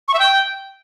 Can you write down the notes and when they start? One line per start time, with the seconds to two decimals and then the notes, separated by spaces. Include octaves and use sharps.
0.08 C#6
0.14 E5
0.19 G5